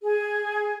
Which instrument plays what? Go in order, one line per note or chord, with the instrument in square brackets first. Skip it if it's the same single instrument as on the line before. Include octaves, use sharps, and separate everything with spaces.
[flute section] G#4